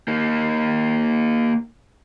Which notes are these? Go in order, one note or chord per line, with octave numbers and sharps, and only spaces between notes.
A#3 D#4